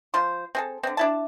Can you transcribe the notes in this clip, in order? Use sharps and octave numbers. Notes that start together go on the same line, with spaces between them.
F3 C5 C6
C4 G#4 A4
D3 C4
D4 E4 A5